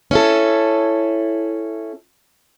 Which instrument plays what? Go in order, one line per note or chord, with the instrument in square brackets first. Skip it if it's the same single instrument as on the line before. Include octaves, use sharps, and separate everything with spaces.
[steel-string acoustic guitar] C#4 E4 A4